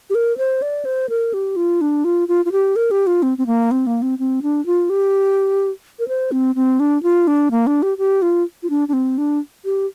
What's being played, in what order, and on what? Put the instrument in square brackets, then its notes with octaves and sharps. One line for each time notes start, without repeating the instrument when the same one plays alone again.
[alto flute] G4
A#4
C5
D5
C5
A#4
G4
F4
D4
F4
F4
F4
G4
A#4
G4
F4
C4
C4
A#3
C4
A#3
C4
C4
D4
F4
G4
A#4
C5
C4
C4
D4
F4
D4
A#3
D4
G4
G4
F4
F4
D4
D4
C4
D4
G4